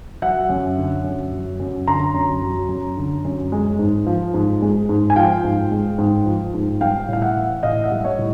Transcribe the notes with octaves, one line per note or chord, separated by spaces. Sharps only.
F#3 E5 F#5
F#2
D3
F#2
F#3
F#2
D3 A#5 C6
F#2
F#3
F#2
D3
F#2
G#3
G#2
F3
G#2
G#3
G#2
G#5
F3 F5 G5
G#2
G#3
G#2
F3
G#2
G3 F5 G5
A2 F5
E5 F#5
E3
A2 D#5 F5
E5 F#5
G3
C#5 D#5
A2